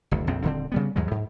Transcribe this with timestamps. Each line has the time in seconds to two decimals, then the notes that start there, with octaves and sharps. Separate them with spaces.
0.11 F#1 D2
0.27 A#1 F2 A#2 C4
0.43 D#1 D3 C4
0.72 C#3 G3 B3
0.96 D#2 G#2 F#3 G#3
1.11 G#2